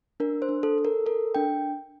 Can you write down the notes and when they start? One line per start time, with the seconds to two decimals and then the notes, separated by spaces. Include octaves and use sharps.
0.20 D4 A#4
0.42 C5
0.49 D4
0.63 A4
0.78 A4
0.85 A#4
1.06 A4 A#4
1.35 D4 G5